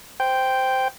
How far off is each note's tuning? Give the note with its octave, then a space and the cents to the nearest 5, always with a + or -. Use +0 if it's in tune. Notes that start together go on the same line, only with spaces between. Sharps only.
C5 -10 G5 +0